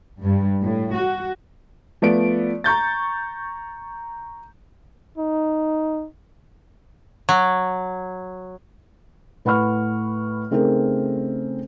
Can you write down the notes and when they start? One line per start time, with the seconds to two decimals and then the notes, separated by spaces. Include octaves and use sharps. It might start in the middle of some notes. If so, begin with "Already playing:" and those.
0.23 G2
0.61 A2
0.93 F#4
2.02 F3 A3 B3 D5 D7
2.64 A#5 C#6 G6 A6
5.18 D#4
7.29 F#3
9.45 A2 B4 F#5 B5 C#6 F6
10.51 C#3 A3 C4 D#4 G#4 A#4